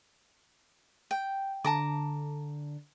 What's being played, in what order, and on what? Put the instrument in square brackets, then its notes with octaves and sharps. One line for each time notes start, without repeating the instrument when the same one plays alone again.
[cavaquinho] G5
[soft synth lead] D3 [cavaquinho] A5 A#5 D6